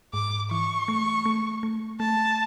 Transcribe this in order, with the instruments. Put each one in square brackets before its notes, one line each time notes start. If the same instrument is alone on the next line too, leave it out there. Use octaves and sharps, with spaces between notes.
[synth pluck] G#2 [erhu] D6
[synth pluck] E3 [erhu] C#6
[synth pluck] A3
A3
A3
[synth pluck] A3 [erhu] A5